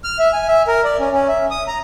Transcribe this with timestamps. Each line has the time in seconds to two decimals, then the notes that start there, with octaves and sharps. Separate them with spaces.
0.04 F6
0.19 E5
0.33 G#5
0.48 E5
0.68 A#4
0.84 D5
0.99 C#4
1.12 C#4
1.28 E5
1.51 D#6
1.67 A#5